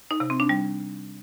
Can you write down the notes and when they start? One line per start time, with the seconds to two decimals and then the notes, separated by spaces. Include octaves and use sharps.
0.11 D#4
0.20 C3
0.30 C4
0.40 D4
0.49 G3